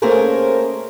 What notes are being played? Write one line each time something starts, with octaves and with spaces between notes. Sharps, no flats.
A3 A#3 C#4 G#4 A#4 C5